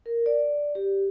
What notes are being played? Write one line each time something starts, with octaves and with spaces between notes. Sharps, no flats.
A#4
D5
G4